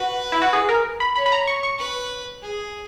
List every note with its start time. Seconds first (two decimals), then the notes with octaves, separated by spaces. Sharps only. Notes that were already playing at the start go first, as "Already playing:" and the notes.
Already playing: F#4 B4
0.32 E4
0.42 F#4
0.53 G#4
0.69 A#4
1.00 B5
1.16 C#5 B5
1.26 B5
1.32 A#5
1.47 C#6
1.63 C#6
1.79 B4
2.42 G#4